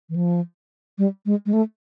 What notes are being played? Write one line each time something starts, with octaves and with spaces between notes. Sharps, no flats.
E3
F3
G3
G#3
G#3
A3